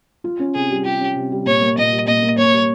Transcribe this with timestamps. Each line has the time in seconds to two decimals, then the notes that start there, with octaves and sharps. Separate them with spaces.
0.24 F4
0.40 C#4
0.55 C3 G#4
0.71 G3
0.85 F4 G4
1.01 C#4
1.16 C3
1.32 G3
1.46 A#2 C#5
1.61 A#3
1.78 A#2 D#5
1.93 G3
2.07 A#2 D#5
2.22 A#3
2.38 A#2 C#5
2.53 G3